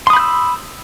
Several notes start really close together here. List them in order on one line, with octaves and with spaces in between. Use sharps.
C6 D#6 B5 G6 E6